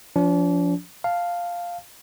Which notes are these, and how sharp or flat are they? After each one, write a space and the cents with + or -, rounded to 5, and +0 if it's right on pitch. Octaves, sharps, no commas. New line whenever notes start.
F3 +0 D4 -40
F5 +0 A5 +0